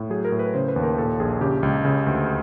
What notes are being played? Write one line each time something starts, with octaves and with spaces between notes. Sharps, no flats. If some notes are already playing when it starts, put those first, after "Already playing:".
Already playing: A2
F#3 G#4
A#4
A2
B4
C#3 C5
B4
D#2
A#4
A#2 A4
A#1 G#4
C#3 G4
C#2
C#3
D2